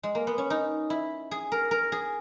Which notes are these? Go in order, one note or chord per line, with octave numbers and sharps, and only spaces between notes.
G#3
A#3
B3
C#4
D#4
E4
G#4
A#4
A#4
G#4